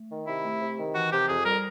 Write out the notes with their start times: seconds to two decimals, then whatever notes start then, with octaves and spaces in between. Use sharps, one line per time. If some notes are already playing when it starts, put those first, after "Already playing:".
Already playing: A3
0.09 D#3
0.26 C3 E4
0.43 A3
0.60 C3
0.78 D#3
0.94 E3 F#4
1.11 C3 G4
1.28 F2 G#4
1.45 G3 A#4